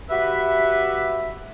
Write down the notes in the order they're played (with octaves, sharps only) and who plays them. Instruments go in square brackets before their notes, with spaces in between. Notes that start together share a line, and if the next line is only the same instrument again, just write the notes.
[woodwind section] F#4 G4 B4 E5